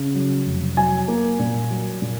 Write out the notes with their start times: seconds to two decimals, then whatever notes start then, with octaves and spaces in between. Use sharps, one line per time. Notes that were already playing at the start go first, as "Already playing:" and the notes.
Already playing: C#3
0.15 F#3
0.46 F1
0.77 F#3 G#5
1.08 A#3
1.39 A#2
1.71 F#3
2.02 A#2